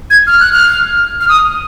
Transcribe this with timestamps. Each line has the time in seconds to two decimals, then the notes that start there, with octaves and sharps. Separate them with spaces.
0.10 G#6
0.27 F6
0.40 F#6
0.52 F6
1.21 F6
1.29 D#6